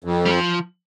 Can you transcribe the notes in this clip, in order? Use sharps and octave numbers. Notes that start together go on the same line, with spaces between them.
F2
G3
F3